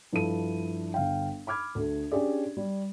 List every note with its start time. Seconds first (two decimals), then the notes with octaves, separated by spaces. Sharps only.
0.13 G2 F3 E4 A4 D#7
0.94 G1 F5 G5
1.47 B5 D6 F6 G#6
1.75 D2 A3
2.12 C#4 D4 G4 G#4 D5
2.57 G3